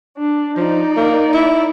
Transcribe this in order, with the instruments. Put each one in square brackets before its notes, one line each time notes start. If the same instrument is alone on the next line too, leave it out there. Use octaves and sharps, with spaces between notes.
[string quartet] D4
[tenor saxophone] F3 [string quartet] D#4 D5
[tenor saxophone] A#3
E4